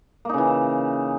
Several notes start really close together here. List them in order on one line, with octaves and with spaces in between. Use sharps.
A#3 D#4 C#3 E3